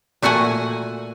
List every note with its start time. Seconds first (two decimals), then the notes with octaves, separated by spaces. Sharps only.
0.22 A#2 A3 F#4 F#5 G#5